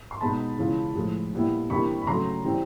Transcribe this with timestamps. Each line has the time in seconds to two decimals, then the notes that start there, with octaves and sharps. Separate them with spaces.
0.11 C6
0.21 B2 G#3 B3 D#4 A5 B5
0.58 C#3 E3 G#3 C#4 F4
0.95 A2 F3 G#3
1.33 A#2 G3 B3 E4
1.70 C3 E3 G3 A#3 D4 B5 C#6
2.02 B5
2.07 C#3 F#3 A3 A#5 C6
2.44 E3 G3 C4